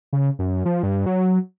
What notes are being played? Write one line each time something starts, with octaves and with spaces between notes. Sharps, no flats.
C#3
F#2
F3
G2
F#3